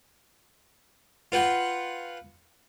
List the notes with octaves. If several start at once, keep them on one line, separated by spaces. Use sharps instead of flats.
F4 B4 F#5 G5